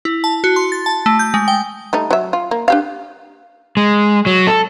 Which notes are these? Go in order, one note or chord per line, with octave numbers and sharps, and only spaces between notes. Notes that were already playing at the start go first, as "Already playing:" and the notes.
E4
A5
F#4
C6
A6
A5
A3
G6
G#3
G5
G3 A3 D#4
F#3 E5
F4
A#3
D4 G4 F5
G#3
F#3
A4